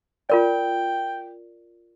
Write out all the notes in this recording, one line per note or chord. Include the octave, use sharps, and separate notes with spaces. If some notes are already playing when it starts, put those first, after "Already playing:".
F4 A#4 D5 G5